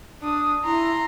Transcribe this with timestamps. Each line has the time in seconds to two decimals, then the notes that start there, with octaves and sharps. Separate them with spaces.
0.21 D4 D#6
0.65 E4 A#5 C6